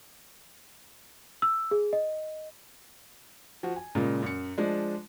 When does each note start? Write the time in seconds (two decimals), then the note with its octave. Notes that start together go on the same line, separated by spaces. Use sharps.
1.42 E6
1.71 G#4
1.93 D#5
3.63 F3 F#4
3.76 G#5
3.95 A#2 C#3 G#3
4.22 F#2 C#7
4.58 F3 G#3 D4